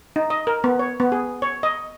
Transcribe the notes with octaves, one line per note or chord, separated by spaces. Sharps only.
D#4
D#5
A#4
B3
C#5
B3
G#4
C#5
D#5